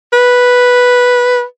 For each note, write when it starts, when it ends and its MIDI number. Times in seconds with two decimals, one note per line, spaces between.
0.13 1.43 71